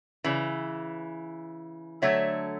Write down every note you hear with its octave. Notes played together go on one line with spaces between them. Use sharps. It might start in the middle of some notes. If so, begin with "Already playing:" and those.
C#3 E3
D3 F#3 A3 C#5 E5